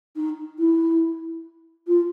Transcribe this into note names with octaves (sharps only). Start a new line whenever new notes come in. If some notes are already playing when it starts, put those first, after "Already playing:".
D#4
E4
F4